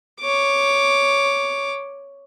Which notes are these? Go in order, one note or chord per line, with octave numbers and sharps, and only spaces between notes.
C#5 D6